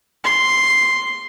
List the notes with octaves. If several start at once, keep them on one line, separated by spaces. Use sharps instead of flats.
C6